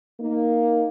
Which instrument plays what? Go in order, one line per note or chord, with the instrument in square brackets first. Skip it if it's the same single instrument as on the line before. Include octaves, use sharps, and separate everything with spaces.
[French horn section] A#3 D#4